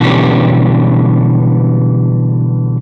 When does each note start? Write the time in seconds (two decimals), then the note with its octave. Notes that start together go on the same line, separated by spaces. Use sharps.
0.01 B2 D3 E3 G3 C#4 G4